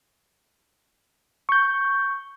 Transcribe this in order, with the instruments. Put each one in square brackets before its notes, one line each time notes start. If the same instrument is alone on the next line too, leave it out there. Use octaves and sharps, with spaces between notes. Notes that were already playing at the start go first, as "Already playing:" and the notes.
[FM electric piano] C#6 G6